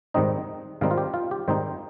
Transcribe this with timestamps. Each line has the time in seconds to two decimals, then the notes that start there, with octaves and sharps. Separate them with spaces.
0.14 G#2 D#3 G3 C4 D#4 D#5
0.81 G#2 D#3 G3 C4 D#4 F5
0.91 F4
0.98 G4
1.14 F4
1.31 G4
1.48 G#2 D#3 G3 C4 D#4 C5